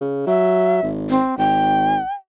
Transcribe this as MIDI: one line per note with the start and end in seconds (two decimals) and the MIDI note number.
0.01 0.22 49
0.27 0.81 54
0.27 0.85 76
0.83 1.19 32
1.10 1.35 60
1.38 1.99 32
1.38 2.13 79